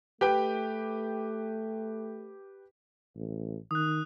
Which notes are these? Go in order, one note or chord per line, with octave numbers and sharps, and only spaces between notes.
A3 G4 B4 G5
A1
D#3 D#6 F#6